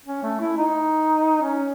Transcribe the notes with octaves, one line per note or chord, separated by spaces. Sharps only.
C#4
A3
E4
D#4
C#4